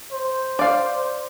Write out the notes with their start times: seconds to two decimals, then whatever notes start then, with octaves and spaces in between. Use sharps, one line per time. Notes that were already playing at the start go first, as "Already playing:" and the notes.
0.12 C5
0.59 D5 F5